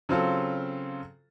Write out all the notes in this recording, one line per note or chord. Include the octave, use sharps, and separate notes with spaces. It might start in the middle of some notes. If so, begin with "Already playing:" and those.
C#3 F#3 C4 F4 A4